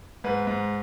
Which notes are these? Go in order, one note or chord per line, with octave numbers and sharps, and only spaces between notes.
G#2 B4
G#2